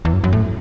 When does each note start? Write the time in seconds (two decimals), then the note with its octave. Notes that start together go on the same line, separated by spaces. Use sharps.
0.05 E2
0.14 F#2
0.24 F#2
0.33 A2